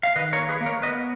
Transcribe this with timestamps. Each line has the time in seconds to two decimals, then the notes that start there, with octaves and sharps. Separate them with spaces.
0.03 F5
0.16 D#3 B4 D#5
0.33 A#4 C#5
0.38 A#3
0.49 G#4 B4
0.61 A#3
0.66 A#4 C#5
0.82 B3 B4 D#5